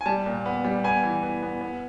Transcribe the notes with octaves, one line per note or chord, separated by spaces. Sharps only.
G#5
G3 A5
A#2
B3
G3
B3 G#5
E3
B3
B3
B3